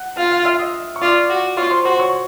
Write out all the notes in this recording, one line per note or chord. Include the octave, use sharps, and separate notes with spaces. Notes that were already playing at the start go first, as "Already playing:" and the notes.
Already playing: F#5 F#6
F4 F5 F6
F5 F6
E5 E6
D#5 D#6
C#6
F4 D5 D6
F#4
F4 C#5 C#6
C5 C6
F#4 C5 C6
C#5 C#6